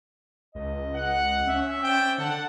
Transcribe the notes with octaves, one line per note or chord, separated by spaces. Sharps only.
C#2 D#5
F#5
C#4 E5
C5 D5 G5
D3 F#5 A5